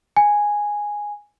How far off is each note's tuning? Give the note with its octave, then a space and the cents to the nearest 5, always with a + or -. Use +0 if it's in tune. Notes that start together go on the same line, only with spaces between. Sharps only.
G#5 -5